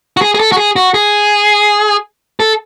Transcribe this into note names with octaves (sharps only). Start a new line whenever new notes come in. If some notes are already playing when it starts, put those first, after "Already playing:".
F#4
G#4
G#4
A4
F#4
G#4
F#4
G#4
A4